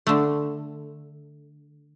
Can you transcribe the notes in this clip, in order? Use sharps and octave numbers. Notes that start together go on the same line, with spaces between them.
D3 A3